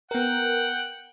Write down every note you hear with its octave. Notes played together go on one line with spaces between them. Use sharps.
B3 A#4 F#5 G5